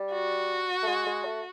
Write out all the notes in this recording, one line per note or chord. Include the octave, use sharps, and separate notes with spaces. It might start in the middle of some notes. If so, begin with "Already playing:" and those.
Already playing: G3
F#4
A3
G#3
G#3
A3